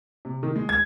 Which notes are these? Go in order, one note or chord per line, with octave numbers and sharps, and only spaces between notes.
C3
D#3
G#3
G#6